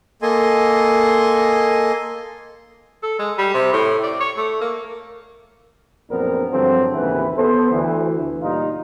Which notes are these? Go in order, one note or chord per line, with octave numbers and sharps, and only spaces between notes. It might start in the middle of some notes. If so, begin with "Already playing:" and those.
A#3 A4 D#5 G#5 C6
A4
G#3
G3
C3
A2
D5
C#5
A3
A#3
A#1 F#2 B3 C4 D4 A#4
G2 D3 F3 F#3 C4
A1 D#2 C#3 E3 B4
B3 A4 C5
D2 E3
A#2 G3 D#4 F4